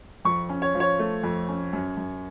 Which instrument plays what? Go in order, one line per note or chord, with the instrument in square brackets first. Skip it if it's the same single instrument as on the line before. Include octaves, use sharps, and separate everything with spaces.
[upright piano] F2 C#6
C#4
C#5
F3
C#5
A3
F2
C#4
F#2
F#2